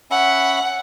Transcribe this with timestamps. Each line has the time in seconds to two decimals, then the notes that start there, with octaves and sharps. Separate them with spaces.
0.11 C#4 E5 F#5 B5